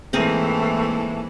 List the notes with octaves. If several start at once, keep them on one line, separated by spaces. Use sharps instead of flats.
G#2 E3 A3 A#3 C4 E4 G#4 A#4